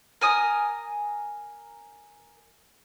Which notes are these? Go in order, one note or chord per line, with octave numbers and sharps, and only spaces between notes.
A#4 G#5 D#6